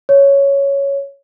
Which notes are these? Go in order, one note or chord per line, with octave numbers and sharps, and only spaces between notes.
C#5